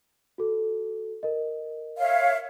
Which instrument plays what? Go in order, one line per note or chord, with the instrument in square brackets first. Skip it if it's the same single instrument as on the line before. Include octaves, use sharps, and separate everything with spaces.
[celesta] F#4 A4
A#4 D#5
[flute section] C#5 E5 F5